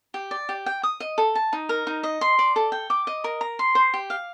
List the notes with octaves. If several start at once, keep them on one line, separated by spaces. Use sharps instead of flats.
G4
D5
G4
G5
D#6
D#5
A4
A5
D#4
A#4
D#4
D#5
C6
D5
A4
G5
D6
D#5
A#4
A#5
C6
C5
G4
F5